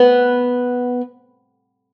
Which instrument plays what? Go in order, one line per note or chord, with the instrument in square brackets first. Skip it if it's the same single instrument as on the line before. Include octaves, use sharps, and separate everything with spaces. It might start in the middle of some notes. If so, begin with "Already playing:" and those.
Already playing: [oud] B3